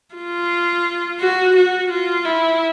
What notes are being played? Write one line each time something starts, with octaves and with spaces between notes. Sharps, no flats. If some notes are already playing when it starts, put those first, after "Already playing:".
F4
F#4
F#4
F4
E4